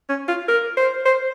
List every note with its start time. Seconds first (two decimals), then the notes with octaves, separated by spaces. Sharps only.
0.10 C#4
0.28 F4
0.48 A#4
0.77 C5
1.06 C5